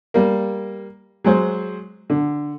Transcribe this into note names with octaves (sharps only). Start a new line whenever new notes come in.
G3 A#3
F#3 G#3 C5
D3